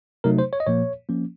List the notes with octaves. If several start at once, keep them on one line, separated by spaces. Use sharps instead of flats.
C3 F#3 A3 D#4 A#4
C5
C#5
D#5
A#2 F3 A#3 C#5
F3 A#3 C#4